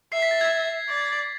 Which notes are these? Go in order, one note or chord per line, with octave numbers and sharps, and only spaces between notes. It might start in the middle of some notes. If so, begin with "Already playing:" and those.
E5 C7
B6
A6
G#6
D5